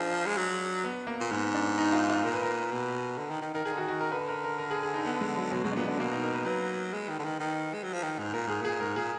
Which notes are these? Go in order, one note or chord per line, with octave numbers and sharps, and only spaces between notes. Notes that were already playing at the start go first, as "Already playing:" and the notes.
Already playing: F3 D4 G#4 A#4
G#3
F#3
B3
A#3
A#2
G#2 B3
D4
D#4
F4
F4
A#2 A#4
B4
A#4
B2
D3
D#3
D#3
D#3 A#4
D#3 G#4
D3
D#3 F#4
F#4
A#4
D3 B4
A#4
A#4
A#4
G#4
G#4
D#4
B3
G#3
F#3
B2 F#3
B2 G#3
D4
A#2 B3
D3 D4
B2 A#3
D#4
A#4
B4
F#3 B4
G#3
D#3
D3
D#3
D#3
G#3
F#3
F3
D#3
G#2
A#2 A#4
G#2 G#4
A#2 G#4
G#2 A#4
A#2 G#4